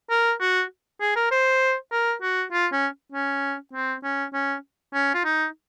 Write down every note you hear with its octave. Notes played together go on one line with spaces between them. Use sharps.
A#4
F#4
G#4
A#4
C5
A#4
F#4
F4
C#4
C#4
C4
C#4
C#4
C#4
F4
D#4